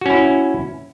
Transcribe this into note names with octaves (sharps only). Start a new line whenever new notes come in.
C#4 E4 F#4